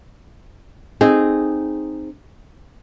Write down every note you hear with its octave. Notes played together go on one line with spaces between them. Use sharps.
C4 D#4 G#4